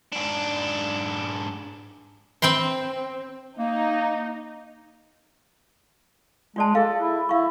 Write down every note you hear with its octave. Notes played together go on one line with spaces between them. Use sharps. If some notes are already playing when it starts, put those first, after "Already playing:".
G#2 D4
C4 G5 B5 C6
A#3 D#4
G#3 F4 D5 A5
G#4 A4 F5
E4
E4 F5 C#6